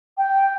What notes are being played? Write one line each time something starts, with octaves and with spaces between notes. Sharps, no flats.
G5